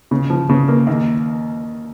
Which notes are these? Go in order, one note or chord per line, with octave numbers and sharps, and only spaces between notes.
C#3
F3
C#3
A#3
D#2